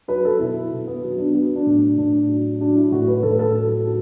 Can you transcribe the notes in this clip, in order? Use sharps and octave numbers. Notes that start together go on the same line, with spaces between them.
F#3 B4
A4
B2 E4
B2
B3
F#3 B3
D4
F#3 B3
D4
A2
D4
A2 D4
F#3
F#3 D4
E4
A2 F#4
B4
A2 A4
B4
A4
F#3
F#3